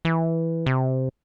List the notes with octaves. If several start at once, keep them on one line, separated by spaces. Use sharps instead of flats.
E3
C3